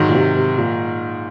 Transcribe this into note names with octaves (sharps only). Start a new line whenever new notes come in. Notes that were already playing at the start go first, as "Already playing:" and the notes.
Already playing: G#2 D#3 F#3
A#2
C3
C3
A#2